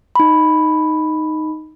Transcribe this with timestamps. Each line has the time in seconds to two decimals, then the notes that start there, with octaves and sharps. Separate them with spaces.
0.15 D#4 B5